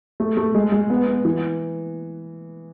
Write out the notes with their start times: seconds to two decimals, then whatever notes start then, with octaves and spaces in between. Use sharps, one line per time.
0.20 A3
0.37 A3
0.54 G#3
0.72 G#3
0.90 B3
1.07 B3
1.25 E3